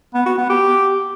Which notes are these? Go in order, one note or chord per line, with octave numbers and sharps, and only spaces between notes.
B3
F#4
B3
G4